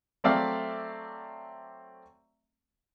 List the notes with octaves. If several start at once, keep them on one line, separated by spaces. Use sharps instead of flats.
F#3 A3 C4 D5 E5 F5